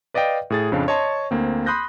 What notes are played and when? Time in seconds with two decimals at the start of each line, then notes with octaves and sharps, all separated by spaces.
0.14 B4 D5 D#5 F5 G5
0.50 A2 G#4 A6
0.72 F2 C#3 C4 D4 F5
0.88 C#5 D#5 A5 C6 C#6
1.31 D2 A#3 C4
1.66 B5 C6 D#6 F#6 G6 A#6